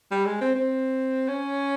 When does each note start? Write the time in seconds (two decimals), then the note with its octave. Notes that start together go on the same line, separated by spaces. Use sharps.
0.12 G3
0.26 G#3
0.41 C4
0.55 C4
1.28 C#4